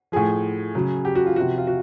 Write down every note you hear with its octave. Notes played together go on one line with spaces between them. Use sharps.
A2 F3 G#4
C#3 F#3
G4
F#4
F4
C3 F3 F#4
F4
F#4